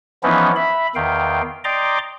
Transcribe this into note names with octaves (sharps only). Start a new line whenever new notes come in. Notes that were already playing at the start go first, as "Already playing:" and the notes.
E3 F3 B3 C#4 D#4 E4
E5 B5
E2 D#3 F5 G5
D5 D#5 G5 A#5 C6 D6